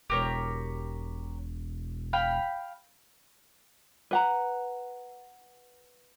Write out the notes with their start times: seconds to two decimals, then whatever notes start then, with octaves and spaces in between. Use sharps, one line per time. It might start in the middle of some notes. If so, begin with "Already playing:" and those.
0.10 E1 G4 A#4 C#5
2.13 F5 G5 B5
4.11 B4 F#5 A#5